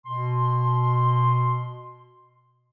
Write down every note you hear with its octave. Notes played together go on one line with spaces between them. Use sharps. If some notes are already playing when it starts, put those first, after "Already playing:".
B2 C6